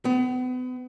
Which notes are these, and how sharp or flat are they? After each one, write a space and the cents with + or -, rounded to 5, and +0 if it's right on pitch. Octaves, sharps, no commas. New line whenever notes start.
B3 +35